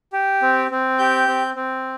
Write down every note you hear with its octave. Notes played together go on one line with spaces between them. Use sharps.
G4
C4
C4
G4 G6
C4
C4